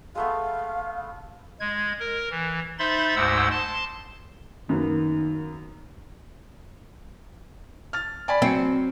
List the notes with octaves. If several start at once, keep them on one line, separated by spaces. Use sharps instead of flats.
G#3 A3 B3 F5
G#3 G#6
A#4
E3
D#4 C5 E5 B5 C6 A6
D2 G#2 G#3 C5 F#5 E6
A5 C6
F#2 D#3 A#3 B3
F6 A6
D5 G#5 B5
F#3 C4 C#7